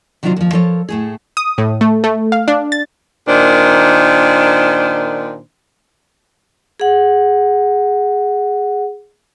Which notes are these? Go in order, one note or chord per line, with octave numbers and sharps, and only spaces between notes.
C3 D#3 F#3 D4 F4 C5
D#2 F3
F3 A4 A#4 C#5
A2 A3 G#4
D#6
A2
A3
A3
F5
D4
A6
A#2 D#3 D4 C5
G#4 F#5